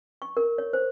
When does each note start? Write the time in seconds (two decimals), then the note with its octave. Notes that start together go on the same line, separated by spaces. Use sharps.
0.22 C#6
0.37 A#4
0.58 C#5
0.73 C5